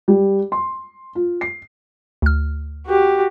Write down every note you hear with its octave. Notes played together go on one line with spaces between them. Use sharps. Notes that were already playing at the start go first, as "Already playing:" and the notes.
G3
C6
F4
C7
D2 F6
F#4 G4